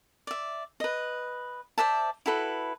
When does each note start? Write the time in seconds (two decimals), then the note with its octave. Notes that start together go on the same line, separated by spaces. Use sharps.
0.27 D5 E5
0.80 B4 D#5
1.78 C5 D5 E5 A5
2.26 E4 F#4 A4 B4